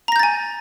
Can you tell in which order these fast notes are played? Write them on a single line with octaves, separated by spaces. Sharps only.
A#5 A#6 G6 A6 G#5